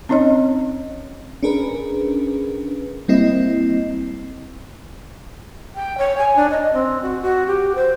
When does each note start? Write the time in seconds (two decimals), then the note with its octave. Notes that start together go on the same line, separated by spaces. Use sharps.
0.09 C4 C#4 D#4 C#5 D#5
1.43 C#4 D4 G#4 A#4 B4
3.08 G3 A#3 C4 E4 D#5
5.75 G5
5.98 C#5
6.18 G#5
6.36 D4
6.50 D#5
6.73 C4
7.02 F#4
7.22 F#4
7.47 G4
7.75 C5